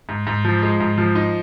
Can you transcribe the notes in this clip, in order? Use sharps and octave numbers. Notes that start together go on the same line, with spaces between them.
G#2
G#2
F3
G#3
G#2
F3
D#4